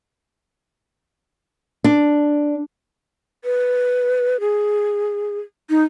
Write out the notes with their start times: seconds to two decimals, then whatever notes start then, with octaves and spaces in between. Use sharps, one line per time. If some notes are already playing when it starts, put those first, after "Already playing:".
1.84 D4
3.45 B4
4.40 G#4
5.70 D#4